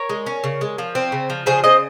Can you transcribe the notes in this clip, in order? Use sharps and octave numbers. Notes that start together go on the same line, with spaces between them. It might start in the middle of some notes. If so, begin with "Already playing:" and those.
Already playing: A#4 C#5
G#3
C#4
C#3
G#3
F3
C4
C#3
F3
C#3 G#4 C5
C#3 C5 D#5